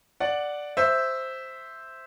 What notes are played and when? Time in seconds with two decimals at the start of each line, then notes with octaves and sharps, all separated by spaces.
0.20 D5 F#5
0.77 C5 E5